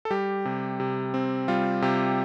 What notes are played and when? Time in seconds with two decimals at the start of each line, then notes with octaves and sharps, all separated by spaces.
0.05 A4
0.10 G3 G4
0.45 C3
0.80 C3
1.14 C4
1.48 G3 F4
1.82 C3 G4